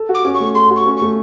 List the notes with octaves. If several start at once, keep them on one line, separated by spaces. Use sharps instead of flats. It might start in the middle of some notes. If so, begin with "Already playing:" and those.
Already playing: A4
F#4
D6
C#4
C#6
A3
A4 C6
F#4
C#6
C#4
C#6
A3